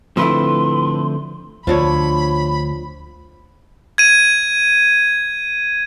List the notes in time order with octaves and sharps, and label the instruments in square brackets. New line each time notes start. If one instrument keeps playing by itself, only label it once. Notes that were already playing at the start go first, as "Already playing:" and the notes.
[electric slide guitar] A2 B4 [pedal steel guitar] D3 C4 [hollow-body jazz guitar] F3 A3 E4 [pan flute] C6
[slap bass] D2 [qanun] F3 D4 C#5 [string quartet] B5
[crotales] G#6 D#7